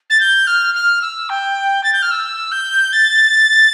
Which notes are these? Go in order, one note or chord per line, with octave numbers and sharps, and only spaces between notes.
A6
G6
F6
F6
E6
G5
A6
G6
F6
E6
G6
A6